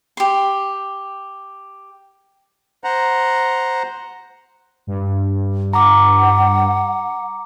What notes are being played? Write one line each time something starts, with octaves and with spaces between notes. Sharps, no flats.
G4 C6
C5 F#5 A#5
G2
F#5 A#5 D6